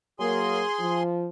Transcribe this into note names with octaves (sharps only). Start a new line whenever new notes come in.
F#3 A#3 G#4 G#5 C6
F3